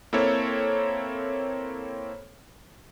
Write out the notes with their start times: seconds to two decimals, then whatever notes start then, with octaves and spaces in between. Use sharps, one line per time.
0.13 A#3 C4 E4 A4 C#5